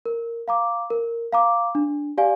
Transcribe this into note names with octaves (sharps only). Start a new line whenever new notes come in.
A#4
F5 A#5 D6
A#4
F5 A#5 D6
D4
G4 D5 F5 G#5